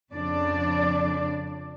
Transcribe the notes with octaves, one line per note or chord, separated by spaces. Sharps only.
F2 C#3 F3 D4 D5